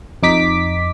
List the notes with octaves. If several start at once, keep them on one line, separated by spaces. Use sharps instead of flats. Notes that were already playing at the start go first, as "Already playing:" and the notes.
F2 D#4 D6 B6